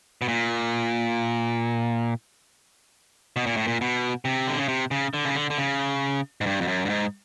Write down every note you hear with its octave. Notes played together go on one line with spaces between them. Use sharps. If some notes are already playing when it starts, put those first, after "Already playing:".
B2
A#2
B2
A#2
A2
A#2
B2
C3
D3
C#3
C3
C#3
D3
C#3
D3
D3
C#3
G#2
G2
F2
F#2
G2
G#2